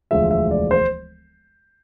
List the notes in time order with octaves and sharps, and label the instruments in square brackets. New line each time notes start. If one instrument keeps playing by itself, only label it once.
[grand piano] E1 D2 D3 F3 G#3 E5
E5
D5
C5